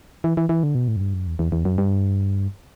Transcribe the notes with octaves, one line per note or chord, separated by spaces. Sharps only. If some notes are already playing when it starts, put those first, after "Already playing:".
E3
E3
E3
D3
B2
A2
F#2
G2
F#2
E2
E2
E2
F#2
G2